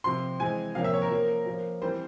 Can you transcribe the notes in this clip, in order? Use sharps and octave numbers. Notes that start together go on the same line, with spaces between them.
C3 F3 C4 C6
E3 G#3 C4 G#5
C3 F3 A#3 C#4 F5
E5
C#5
A#4
F3 A#3 C#4
F3 A#3 C#4
E3 G3 C4 C5